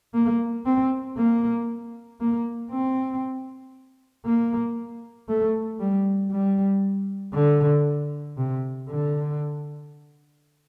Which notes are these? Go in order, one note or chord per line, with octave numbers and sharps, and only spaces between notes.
A#3
C4
A#3
A#3
C4
A#3
A3
G3
G3
D3
C3
D3